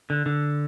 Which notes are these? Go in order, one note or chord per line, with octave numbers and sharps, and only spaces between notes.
D3
D3